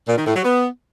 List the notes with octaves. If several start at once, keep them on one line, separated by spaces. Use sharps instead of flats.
A#2
D#3
A2
F#3
B3